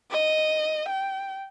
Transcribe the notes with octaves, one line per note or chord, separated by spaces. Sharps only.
D#5
G5